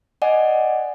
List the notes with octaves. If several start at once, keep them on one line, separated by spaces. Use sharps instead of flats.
D5 D#5 F#5 G#5